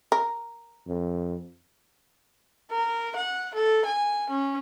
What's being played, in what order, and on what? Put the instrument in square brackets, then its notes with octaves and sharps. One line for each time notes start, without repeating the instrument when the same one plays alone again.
[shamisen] A#4
[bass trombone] F2
[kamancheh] A#4
F#5
A4
G#5
C#4